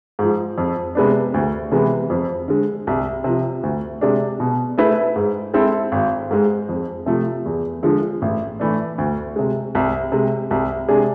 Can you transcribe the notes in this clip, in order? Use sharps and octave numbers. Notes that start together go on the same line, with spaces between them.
G#2 F3
F2
C3 G#3 B3 D4
D2
C3 E3 G#3 B3
F2
D3 G#3
C2
C3 F3
D2
C3 G#3 D4
B2
A3 E4 G#4 B4
G#2
G#3 C4 E4 A4
G#1
G#2 G#3
F2
C3 F3 A3
E2
D3 F3 G#3
A1
A2 E3 A3 D4
D2
C3 G#3
C2
C3 G#3
C2
C3 G#3 D4 G#4